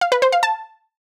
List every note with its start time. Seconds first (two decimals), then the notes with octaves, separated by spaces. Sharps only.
0.01 F5
0.12 B4
0.22 C5
0.32 F5
0.43 A5